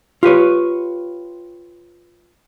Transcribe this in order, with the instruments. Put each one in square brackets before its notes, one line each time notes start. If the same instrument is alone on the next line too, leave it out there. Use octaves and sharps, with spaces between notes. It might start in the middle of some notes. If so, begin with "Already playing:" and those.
[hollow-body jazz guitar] F4 G4 B4 C#5